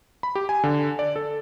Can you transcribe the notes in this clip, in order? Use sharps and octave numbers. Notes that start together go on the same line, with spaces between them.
B5
G4
G#5
D3
D5
A4